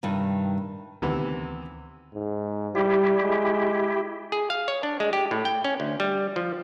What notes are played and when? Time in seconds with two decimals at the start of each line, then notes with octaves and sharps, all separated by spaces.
0.03 G2 C3 D#3
1.02 D2 C3 D#3 E3 B3
2.14 G#2
2.75 G3 E4 G4
3.23 G#3
4.32 G#4
4.50 F5
4.68 C#5
4.83 D4
5.00 G#3
5.13 G4
5.31 A2
5.45 G5
5.64 C#4
5.80 D2
6.00 G3
6.36 F3